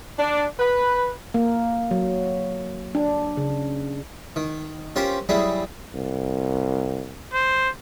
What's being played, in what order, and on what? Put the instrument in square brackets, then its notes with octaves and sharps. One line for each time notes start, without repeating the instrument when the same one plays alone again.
[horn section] D4
B4
[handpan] A#3
F#3
D4
C#3
[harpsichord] D#3
C#4 F4 G4 A#4 C5
F#3 G3 E4 G#4
[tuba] C2
[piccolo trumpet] C5